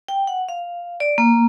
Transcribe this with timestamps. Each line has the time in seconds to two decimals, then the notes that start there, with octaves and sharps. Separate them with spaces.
0.08 G5
0.27 F#5
0.49 F5
1.00 D5
1.18 A#3